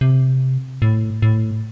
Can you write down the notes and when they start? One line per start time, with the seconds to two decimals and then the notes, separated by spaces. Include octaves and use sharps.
0.01 C3
0.82 A2
1.22 A2